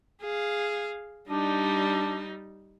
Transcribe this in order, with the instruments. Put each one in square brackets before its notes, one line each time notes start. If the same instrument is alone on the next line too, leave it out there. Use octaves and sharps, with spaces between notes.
[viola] G#4 F5
[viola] G3 D#4 [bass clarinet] D4